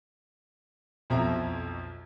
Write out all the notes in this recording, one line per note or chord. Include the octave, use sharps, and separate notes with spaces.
B1 F2 B2 F3 E4 A#5